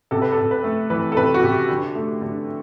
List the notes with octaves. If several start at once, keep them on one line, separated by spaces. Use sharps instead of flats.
C3 A4
B4
A4
C3
B4
A3
E3 B4
A4
C3 B4
F#4
C3 G4
D3
A3
D3